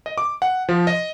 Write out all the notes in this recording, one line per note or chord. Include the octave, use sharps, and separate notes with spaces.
D#5
D6
F#5
F3
D#5